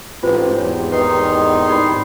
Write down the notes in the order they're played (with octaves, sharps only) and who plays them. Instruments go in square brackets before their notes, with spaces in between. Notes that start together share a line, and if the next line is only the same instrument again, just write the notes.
[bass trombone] A1 [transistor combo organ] G#2 C4 G4 [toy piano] F4 B4 C5
[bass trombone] E2 [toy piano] C#5
[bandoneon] D#3 D#4 C6 [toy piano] B4
[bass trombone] G#1 [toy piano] D5 B5